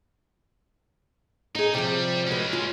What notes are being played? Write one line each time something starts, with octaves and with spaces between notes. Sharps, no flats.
D#4 G#4 D#5
C3 F3 G3
G#3 C#4 F#4 B4
F4